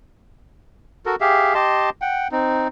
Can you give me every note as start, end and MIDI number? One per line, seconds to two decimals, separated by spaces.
1.06 1.16 66
1.06 1.16 69
1.06 1.16 70
1.21 1.54 67
1.21 1.54 68
1.21 1.54 76
1.21 1.54 77
1.55 1.90 67
1.55 1.90 75
1.55 1.90 81
1.55 1.90 84
2.02 2.28 78
2.02 2.28 79
2.32 2.68 60
2.32 2.68 63